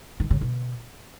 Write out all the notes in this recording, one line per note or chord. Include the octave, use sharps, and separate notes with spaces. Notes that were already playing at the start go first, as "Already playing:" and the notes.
D#3
C#3
B2